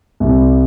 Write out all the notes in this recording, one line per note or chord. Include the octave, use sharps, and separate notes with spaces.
C2